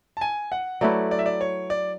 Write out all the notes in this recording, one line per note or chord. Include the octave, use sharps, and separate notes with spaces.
A5
G#5
F#5
F#3 A3 E4 B4 D5
D5
E5
D5
C#5
D5